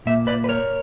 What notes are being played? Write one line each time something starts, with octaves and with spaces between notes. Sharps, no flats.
A#2 A#3 E5
B4 D5
B4
A#4 C#5